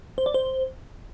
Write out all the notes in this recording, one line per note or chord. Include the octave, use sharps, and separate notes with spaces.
C5
D5
C5